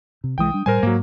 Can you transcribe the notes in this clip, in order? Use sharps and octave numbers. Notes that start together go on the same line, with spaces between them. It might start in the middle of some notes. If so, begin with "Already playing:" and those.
C3
C2 E3 G#3 G5 D#6
G3 D4
A2 G3 A#4 C5 G#5
G#2 F#3 A#3